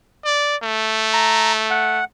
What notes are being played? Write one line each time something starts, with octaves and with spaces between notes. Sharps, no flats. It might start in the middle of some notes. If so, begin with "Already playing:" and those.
D5
A3
A#5
F#5